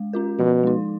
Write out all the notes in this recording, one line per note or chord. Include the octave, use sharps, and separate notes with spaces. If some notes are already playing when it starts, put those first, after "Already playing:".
Already playing: G#3
C#4 F4 A#4
B2 F3
G#3 D#4